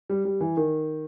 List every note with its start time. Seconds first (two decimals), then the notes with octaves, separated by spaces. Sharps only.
0.10 G3
0.25 G3
0.40 E3
0.57 D#3